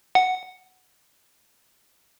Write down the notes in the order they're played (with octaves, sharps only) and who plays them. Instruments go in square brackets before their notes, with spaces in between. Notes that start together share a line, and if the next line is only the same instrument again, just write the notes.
[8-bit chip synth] F#5